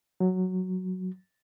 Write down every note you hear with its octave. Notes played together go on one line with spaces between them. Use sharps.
F#3